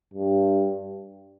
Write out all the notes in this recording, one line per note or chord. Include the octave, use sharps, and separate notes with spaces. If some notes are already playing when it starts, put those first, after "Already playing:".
G2